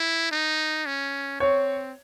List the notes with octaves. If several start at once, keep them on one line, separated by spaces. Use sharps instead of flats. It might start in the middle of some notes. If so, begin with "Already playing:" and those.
Already playing: E4
D#4
C#4
C4 C#5